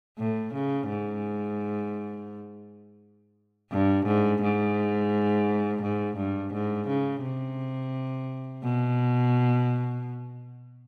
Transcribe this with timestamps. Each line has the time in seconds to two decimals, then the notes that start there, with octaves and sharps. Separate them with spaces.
0.18 A2
0.54 C#3
0.89 G#2
3.72 G2
4.06 G#2
4.42 G#2
5.82 G#2
6.17 G2
6.53 G#2
6.88 C#3
7.23 C3
8.63 B2